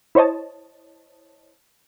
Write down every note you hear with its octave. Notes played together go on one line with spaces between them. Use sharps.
E4 C5 C#5 D#5 A5